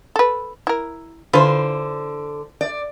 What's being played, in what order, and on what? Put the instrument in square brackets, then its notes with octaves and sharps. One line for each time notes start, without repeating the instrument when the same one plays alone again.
[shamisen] A4 B4
E4 A#4
[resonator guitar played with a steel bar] D3 C5 [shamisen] E3 F4 B4
[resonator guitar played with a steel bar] D5